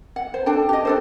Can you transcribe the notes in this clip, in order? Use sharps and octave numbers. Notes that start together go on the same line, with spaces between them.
F#5
C5
D4 A4 G5
G4 D#5
D4 A4 C5